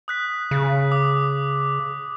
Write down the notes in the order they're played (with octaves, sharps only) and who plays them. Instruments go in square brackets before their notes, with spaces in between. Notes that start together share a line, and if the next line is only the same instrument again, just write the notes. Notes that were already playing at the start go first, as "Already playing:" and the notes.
[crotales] D#6 F#6 B6
[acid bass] C#3
[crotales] D6 D#6